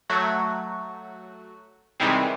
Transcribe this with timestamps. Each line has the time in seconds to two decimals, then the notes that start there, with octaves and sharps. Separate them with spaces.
0.10 F#3 A3 F#4
2.00 C3 D#3 E3 G3 G#3 C4